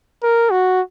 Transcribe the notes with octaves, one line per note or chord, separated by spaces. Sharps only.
A#4
F#4